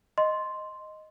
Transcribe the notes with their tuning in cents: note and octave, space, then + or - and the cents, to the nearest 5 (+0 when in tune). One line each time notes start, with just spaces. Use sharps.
D#5 +0 C6 +0